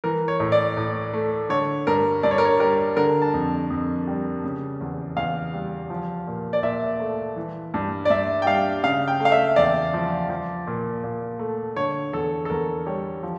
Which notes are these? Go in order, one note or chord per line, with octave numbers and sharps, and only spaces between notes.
E3 A#4
C#5
A2
D5
A2
A3
D3 C#5
G2 A#4
G2 D5
C#5
A#4
C#5
G3 A#4
D3 A#4
A5
F2
F2
G3
C#3
E2
E2 F5
G3
F3
A#2
D5
A#2 E5
A3
E3
G2
D5
G2 E5
G5
G3 F5
C#3 F5
G5
A3
F5
E5
E2 D5
F3
F3
A#2
A#2
A3
D3 C#5
E2 A4
A4
E2 A#4
G3 C#5
F3